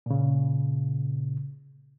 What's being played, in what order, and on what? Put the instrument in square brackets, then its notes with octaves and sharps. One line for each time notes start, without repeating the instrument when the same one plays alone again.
[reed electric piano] A#2 C#3